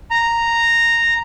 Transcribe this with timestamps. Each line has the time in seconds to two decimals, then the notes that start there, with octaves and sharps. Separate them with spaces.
0.11 A#5